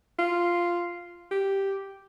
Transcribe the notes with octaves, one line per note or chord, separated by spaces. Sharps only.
F4
G4